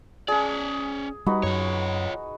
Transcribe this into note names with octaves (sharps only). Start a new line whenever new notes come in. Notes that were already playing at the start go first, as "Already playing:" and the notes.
C#4 G#4 D5
G3 D#4 F#4 B4
F#2 F4 C#5